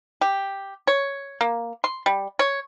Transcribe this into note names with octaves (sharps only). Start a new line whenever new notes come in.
G4
C#5
A#3
C6
G3
C#5